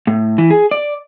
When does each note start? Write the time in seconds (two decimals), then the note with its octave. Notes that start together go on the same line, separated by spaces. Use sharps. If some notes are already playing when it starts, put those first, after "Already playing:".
0.07 A2
0.38 E3
0.50 G#4
0.71 D5